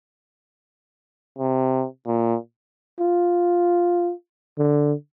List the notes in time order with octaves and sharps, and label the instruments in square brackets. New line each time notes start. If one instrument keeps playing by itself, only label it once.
[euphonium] C3
A#2
[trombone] F4
D3